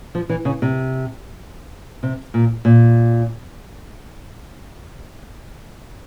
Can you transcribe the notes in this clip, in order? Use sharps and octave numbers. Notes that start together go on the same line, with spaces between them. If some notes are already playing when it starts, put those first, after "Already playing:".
F3
E3
C#3
C3
C3
A#2
A#2